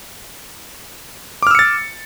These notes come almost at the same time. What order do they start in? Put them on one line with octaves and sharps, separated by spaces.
D6 F6 E6 C#7 A6